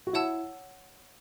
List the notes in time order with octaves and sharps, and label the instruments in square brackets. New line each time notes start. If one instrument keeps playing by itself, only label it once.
[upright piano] F#4
[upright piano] E4 [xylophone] C#5 F#5 A5 E6